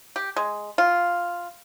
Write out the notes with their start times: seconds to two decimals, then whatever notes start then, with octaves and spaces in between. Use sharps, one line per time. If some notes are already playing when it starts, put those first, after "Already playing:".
0.16 G4
0.36 G#3
0.78 F4